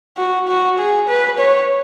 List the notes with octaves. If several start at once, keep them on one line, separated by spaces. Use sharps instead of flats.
F#4
F#4
G#4
B4
C#5